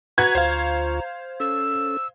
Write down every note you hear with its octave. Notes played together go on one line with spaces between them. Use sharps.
F#4 B4 F#5 A#5 G#6
D2 F4 C5 F5 C#6
C#4 A4 E6